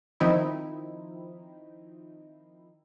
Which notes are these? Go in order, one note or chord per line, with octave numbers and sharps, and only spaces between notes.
D#3 F3 C4 D#4 E4